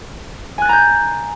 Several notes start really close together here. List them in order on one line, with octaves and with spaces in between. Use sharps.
G#5 F#6 A6 A#5 G6